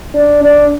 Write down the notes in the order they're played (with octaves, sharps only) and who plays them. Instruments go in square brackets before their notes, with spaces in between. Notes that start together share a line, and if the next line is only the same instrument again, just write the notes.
[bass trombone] D4
D4